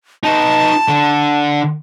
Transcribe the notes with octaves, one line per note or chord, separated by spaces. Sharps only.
D#4 B4 A5
D3